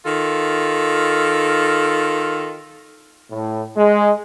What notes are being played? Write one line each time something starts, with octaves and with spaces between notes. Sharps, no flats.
D#3 F4 A4
A2
G#3